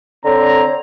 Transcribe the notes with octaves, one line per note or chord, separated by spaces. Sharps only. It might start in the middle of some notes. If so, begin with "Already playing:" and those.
D3 C4 C#5 A#5